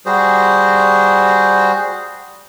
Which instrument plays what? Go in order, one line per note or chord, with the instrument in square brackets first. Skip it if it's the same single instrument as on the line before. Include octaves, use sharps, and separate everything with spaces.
[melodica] G3 F#4 G#4 C5